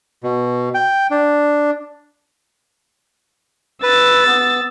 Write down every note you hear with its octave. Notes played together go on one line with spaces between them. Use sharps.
B2
G5
D4
B4 E6 A6
B3